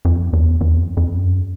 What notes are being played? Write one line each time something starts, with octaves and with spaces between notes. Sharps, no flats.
F2
E2
E2
F2
F2
F#2